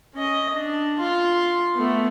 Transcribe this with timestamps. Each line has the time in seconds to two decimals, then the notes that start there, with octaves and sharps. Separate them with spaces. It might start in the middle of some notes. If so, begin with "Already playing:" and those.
0.15 C#4 D#5
0.54 D4
0.99 F4 C6
1.75 A3 B3